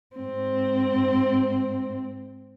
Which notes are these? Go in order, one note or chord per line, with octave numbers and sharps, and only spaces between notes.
G#2 C4